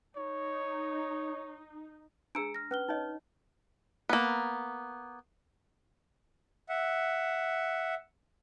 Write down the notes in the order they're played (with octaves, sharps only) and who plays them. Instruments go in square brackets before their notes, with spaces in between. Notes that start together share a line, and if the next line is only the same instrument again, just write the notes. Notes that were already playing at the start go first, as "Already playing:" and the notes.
[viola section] D#4 [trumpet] C#5
[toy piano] D4 A#5 E6 [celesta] G#4 C#7 D7
[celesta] F6 A#6
[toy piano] C#4 [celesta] B4 F6 G7
[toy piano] D#4 C#5 D#5
[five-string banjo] A#3 B3
[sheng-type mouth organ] E5 F#5